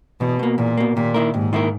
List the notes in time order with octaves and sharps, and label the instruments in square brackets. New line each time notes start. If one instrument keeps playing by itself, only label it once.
[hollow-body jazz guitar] E2 [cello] B2
[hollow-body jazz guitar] B2 A#3
[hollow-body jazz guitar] E2 [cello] A#2
[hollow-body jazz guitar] B2 A#3
[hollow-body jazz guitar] D#2 [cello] A#2
[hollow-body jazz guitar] D#3 A#3 E4 A#4
[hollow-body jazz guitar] D#2 [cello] G#2
[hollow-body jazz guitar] D#3 A#3 E4 A#4